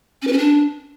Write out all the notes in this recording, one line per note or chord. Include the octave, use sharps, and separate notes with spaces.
C#4
B4
C#4
D4